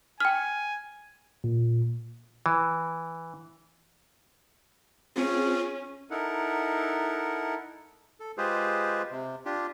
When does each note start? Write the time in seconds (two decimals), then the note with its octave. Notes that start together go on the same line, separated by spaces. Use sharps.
0.20 G5 G#5 F6
1.44 A#2
2.46 E3
5.16 C4 C#4 F4 G#4
6.11 D#4 E4 A4 A#4 F#5
8.20 A4
8.38 G#3 F4 G4 G#4 B4 C5
9.11 C3
9.45 D4 F4 G4